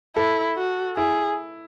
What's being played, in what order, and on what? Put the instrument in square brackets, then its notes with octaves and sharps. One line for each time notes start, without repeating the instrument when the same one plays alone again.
[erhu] E4 [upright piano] A4
[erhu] F#4
[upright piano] E4 [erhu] G#4